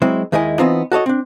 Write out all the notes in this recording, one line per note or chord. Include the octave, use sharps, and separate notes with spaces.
F#3 G#3 C4 E4
D#2 D#3 G#3 E4 D#5 G#5
E3 B3 C4 D#4 F4
F#4 A4 C#5 D#5
C4 D4